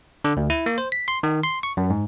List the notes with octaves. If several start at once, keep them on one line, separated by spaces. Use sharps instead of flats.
D3
D2
E4
A#3
C5
B6
C6
D#3
C6
C#6
F#2
G#2